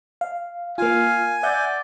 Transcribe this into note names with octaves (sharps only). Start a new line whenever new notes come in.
F5
A#3 F4 F5 G#5
D5 E5 F#5 G6